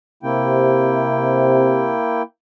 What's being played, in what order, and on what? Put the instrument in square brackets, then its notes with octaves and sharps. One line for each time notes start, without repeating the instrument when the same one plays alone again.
[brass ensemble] C3 [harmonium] A#3 E4 G5